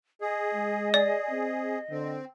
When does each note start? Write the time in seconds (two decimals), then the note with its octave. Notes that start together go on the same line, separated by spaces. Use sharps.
0.21 G#4 D#5
0.54 G#3
0.94 G#4 D5
1.29 C4
1.91 D3 C4